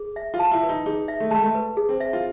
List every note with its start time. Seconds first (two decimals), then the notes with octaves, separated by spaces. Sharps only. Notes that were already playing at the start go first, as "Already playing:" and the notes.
Already playing: G#4
0.16 E5
0.34 F4
0.39 A5
0.51 E4
0.63 B4
0.69 D#4
0.86 D#4 G#4
1.08 E5
1.20 A3
1.31 G#3 A5
1.42 A3
1.55 B4
1.77 G#4
1.89 C4
2.00 E5
2.13 F4